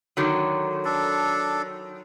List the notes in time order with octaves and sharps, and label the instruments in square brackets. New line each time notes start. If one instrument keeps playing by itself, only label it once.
[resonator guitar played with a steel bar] D3 D#3 F#3
[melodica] D4 A4